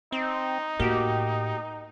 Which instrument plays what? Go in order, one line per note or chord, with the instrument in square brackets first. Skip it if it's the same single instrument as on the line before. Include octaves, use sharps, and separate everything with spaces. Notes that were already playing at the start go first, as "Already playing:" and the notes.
[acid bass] C4 [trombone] D#4
[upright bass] A2 [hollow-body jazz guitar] A#3 F#4 [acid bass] G4